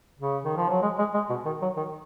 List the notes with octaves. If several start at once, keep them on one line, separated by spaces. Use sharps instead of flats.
C#3
D#3
F3
F#3
G#3
G#3
G#3
B2
D#3
F#3
D#3